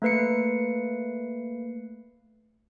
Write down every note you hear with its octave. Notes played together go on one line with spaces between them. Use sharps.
A3 A#3 B4 C7 C#7